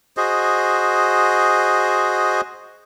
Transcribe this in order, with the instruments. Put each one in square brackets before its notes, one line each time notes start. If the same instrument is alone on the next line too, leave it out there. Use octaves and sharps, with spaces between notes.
[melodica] F#4 G#4 C5 D#5